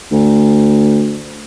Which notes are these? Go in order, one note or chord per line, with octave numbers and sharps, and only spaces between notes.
D2